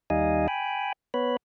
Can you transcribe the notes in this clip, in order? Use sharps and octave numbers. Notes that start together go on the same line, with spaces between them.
D#2 G3 D#4 D#5 F5 G#5
G5 G#5 B5
B3 B4 C#5 B5